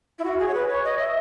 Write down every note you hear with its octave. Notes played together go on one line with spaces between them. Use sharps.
E4
F#4
G#4
C#5
B4
C#5
D#5
E5